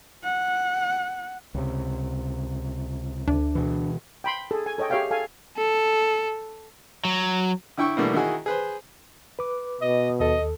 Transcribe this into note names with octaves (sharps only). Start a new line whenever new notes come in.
F#5
C#2 C3
D2 D4
B2 E3
G5 B5 C6
G#4 A4
G#5
A4 C#5 D#5 G5
G4 G#4 C#5 E5 F5 G5
A4 F5 G#5
A4
F#3
D3 E4 G5 C#6 E6
B2 D3 E3 G3 A3 A#3
D#3 D#4 E4 F#4 G#4
G#4 B4 C5
B4 D6
B2 D#5
D#2 A4 D#5